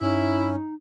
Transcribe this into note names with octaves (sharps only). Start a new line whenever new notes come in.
G2 C#4 D#4 E4